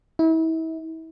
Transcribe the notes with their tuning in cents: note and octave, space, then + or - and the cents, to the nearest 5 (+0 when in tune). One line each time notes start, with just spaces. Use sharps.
E4 -35